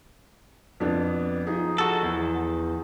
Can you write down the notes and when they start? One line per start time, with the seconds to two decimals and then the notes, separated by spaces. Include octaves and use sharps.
0.80 F2 B3 D4
1.47 F3 D#4 G#4
1.78 F#4 A4
2.03 E2